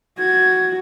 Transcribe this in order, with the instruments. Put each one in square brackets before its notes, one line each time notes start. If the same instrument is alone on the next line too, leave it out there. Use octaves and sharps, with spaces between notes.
[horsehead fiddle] F#4 [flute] G#6